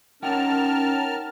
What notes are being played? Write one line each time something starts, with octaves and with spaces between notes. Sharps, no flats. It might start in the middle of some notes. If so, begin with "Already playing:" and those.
C#4 D#4 A#4 F#5 G5 A5 F6